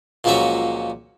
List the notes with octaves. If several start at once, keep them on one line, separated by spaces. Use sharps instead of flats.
C#2 A#2 F3 F#3 C#4 E5